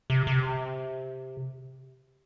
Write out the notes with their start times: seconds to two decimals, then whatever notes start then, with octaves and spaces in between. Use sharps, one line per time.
0.10 C3
0.27 C3